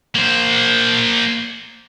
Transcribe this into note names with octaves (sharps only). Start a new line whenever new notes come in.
A#3 C5